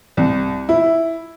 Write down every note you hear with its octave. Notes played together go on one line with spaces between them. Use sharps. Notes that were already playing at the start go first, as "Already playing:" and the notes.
C2
E4